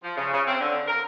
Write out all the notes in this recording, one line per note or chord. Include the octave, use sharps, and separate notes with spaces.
F3
C#3
C#3
C4
D3
A#4